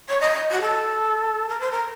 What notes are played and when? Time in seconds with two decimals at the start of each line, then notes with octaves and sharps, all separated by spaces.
0.08 C#5
0.20 D#5
0.50 F#4
0.60 A4
1.48 A#4
1.60 C5
1.71 A#4